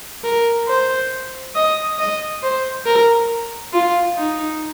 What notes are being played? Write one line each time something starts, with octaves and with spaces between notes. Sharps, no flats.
A#4
C5
D#5
D#5
C5
A#4
F4
D#4